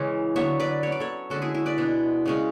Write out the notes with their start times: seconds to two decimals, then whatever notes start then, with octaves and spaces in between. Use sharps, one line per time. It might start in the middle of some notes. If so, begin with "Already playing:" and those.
Already playing: C#3 E3 G#3 C#4
0.36 D3 F#3 B3 C#5 E5
0.60 B4 D5
0.83 F#3 C#4 C#5
0.92 D5
1.00 A4 C#5
1.30 D3 G#3 C#4 F#4 A4
1.42 E4 G#4
1.55 E4
1.66 B4 D5
1.78 B2 G#3 D4
2.26 C#3 G#3 C#4